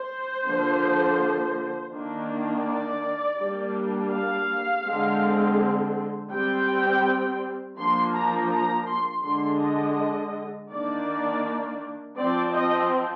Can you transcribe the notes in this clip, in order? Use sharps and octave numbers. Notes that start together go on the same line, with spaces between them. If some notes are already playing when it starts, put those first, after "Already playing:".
Already playing: C5
D3 F3 A#3
D#3 A#3 D4
D5
G3 A#3 D4
F5
D3 G#3 C4
G3 C4 G5
F3 A#3 D4 C6
A#5
A#5
C6
D3 G#3 D4 C6
D#5
D#3 A#3 D4 D5
F3 C4 D5
D#5